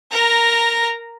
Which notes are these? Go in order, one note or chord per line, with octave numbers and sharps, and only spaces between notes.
A#4 A#5